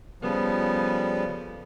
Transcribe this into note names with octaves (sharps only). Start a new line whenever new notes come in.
C#3 F3 G3 B3 A4